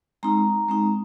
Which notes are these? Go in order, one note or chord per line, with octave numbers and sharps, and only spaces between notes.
G#3 C4 D#4 A#5
G#3 C4 D#4